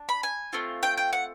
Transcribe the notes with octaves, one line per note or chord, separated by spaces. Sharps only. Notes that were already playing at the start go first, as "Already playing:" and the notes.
Already playing: D4
B5
G#5
A3 C4 F4
G5
G5
F#5